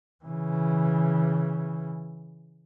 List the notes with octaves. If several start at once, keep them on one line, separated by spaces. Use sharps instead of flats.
C#3 E3